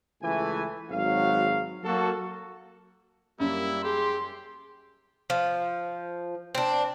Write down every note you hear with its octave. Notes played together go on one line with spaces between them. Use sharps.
C#2 E3 A3 E5 G#5
G#1 F#3 F5
F#3 A#3 F#4 A4
F#2 G3 A#3 E4
G4 G#4 C6
F3
C4 D4